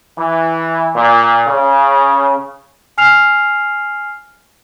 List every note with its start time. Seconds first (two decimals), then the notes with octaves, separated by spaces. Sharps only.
0.16 E3
0.94 A#2
1.46 C#3
2.98 G#5 F6 C7 F7